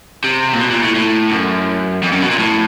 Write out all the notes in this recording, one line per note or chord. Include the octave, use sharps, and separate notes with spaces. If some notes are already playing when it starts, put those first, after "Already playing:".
C3
A#2
B2
A#2
A2
A2
F#2
F2
F#2
B2
A#2
A2